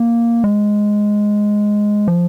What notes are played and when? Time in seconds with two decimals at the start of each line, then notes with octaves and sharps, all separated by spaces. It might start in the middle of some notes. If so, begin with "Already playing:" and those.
Already playing: A#3
0.44 G#3
2.08 F3